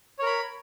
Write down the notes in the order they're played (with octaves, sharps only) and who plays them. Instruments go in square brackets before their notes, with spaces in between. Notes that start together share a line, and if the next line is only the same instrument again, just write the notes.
[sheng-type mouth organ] C#5
A#4
B5